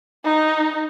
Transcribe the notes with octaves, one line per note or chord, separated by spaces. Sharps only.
D#4